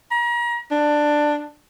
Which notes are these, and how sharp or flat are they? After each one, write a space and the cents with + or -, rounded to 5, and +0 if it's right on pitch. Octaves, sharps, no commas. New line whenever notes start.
A#5 +35
D4 +10